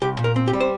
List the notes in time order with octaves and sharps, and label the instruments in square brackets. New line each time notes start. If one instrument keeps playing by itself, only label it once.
[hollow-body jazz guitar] C2 G4
A#2
A#4
C4
G4
G3
C5